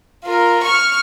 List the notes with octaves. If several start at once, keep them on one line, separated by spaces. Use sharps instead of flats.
F4 A#4
C#6 F6